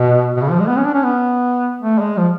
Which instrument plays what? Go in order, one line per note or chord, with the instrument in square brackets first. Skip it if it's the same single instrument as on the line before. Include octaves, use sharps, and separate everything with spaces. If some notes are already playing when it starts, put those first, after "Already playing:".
Already playing: [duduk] B2
B2
C#3
F3
G#3
B3
C#4
D4
C#4
B3
A3
G#3
F3